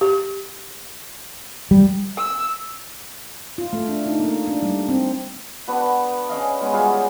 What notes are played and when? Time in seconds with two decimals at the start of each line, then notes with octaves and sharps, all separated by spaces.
0.01 G4
1.71 G3
2.17 E6
3.58 F4
3.73 A3
3.88 D4
4.06 D#4
4.20 A#3
4.48 D4
4.62 G3
4.89 C4
5.67 B3 D4 F#4 B4
6.29 C#4 D5 D#5 F5
6.61 G#3 B3 C#4 C#5
6.73 G3 F4 F#4 G#4